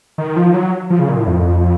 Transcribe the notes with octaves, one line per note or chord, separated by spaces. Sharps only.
D#3
F3
F#3
F3
C#3
A#2
A2
F2